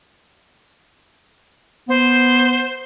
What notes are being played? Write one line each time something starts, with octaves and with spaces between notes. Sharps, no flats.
B3 C5